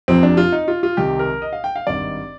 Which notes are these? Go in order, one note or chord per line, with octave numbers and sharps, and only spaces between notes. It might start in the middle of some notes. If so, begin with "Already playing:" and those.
F1 F2 C3 F3 C4
D4
F4
D#4
F4
F4
C2 C3 D#3 G4
A#4
D#5
F5
G5
F5
G#1 G2 D#3 D5